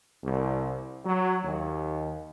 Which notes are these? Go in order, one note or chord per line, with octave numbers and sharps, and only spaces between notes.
C2
F#3
D#2